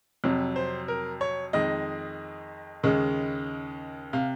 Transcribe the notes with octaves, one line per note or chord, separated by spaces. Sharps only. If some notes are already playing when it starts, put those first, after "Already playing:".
F2 C3 F#3
C5
A#4
C#5
F2 D#3 G#3 D#5
D#2 C#3 G#3
C3 F5